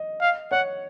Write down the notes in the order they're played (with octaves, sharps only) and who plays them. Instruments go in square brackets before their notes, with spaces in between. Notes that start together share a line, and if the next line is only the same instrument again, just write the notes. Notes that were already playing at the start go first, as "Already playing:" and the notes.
Already playing: [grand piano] D#5
[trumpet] F5
[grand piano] C#5 [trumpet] F#5